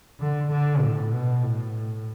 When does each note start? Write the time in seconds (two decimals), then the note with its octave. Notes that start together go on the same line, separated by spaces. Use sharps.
0.20 D3
0.51 D3
0.82 A2
1.12 B2
1.43 A2